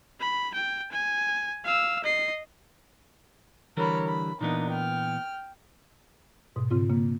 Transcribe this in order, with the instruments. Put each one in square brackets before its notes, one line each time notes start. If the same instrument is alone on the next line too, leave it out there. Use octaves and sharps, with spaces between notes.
[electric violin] B5
G5
G#5
F5 E6
D#5 C7
[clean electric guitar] D3 E3 G3 [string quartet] A#4 C#5 B5
[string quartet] B5
[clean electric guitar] A#2 E3 B3 [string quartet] A#3 D4 D#4
[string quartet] G5 F6
[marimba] G#2 B2
G#2 C#3 C4 F4
C#3 A#3